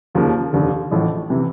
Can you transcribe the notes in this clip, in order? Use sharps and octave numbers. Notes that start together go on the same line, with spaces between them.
F1 D#2 C#3 F3 A#3
F1 D#2 D3
A1 A2 F3
C3 E3